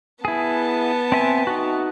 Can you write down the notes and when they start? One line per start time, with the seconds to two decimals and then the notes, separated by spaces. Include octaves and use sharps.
0.25 B3 E4 G#4 A5
1.12 C4 E5 G#5
1.47 D#4 F#4